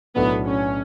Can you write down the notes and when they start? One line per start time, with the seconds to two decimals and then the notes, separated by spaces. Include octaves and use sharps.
0.15 B1 A2 F#3 A3 B3 D4
0.47 C#4